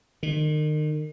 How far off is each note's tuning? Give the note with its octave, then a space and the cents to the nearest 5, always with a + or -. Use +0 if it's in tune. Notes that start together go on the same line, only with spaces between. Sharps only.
D#3 -35